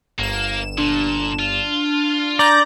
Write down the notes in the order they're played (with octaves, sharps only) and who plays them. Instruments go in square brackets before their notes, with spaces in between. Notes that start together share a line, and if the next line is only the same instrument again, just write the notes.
[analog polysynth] G1 E7 [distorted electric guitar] A#3
[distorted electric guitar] A#2 [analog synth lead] D4
[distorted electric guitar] F4
[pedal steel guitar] D5 [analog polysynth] A#5 G6 A#6